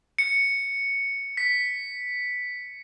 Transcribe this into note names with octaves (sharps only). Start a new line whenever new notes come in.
C#7
B6